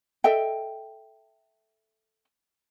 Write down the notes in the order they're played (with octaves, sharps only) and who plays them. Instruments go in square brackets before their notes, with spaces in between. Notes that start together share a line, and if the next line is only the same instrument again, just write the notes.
[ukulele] A4 D#5 E5 G5